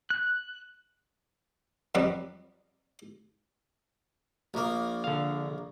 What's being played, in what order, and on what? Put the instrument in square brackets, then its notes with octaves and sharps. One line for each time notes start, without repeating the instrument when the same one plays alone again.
[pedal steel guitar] F#6
[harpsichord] F2 F#3 G3 B4 D#5
A#1 A#3
[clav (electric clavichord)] D3 F5